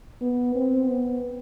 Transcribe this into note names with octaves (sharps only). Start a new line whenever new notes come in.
B3
C4
B3